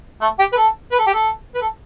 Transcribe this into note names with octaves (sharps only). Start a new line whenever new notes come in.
A3
G4
B4
A4
B4
A4
G4
A4
B4
A4